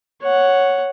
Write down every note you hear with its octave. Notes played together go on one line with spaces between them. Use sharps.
C#5 F#5